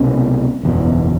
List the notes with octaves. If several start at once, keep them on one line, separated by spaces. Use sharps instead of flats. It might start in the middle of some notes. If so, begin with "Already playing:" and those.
Already playing: C2 B2 C#4
F#1 E2 B2